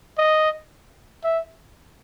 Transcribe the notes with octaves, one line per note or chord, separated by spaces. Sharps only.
D#5
E5